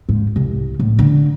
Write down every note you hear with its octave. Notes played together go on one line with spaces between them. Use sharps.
G#2
C2
A2
D3